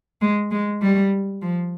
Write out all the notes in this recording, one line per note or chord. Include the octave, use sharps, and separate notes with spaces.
G#3
G#3
G3
F3